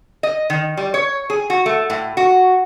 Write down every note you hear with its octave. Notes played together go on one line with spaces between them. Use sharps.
D#5
D#3
G3
C#5
G#4
F#4
A3
A2
F#4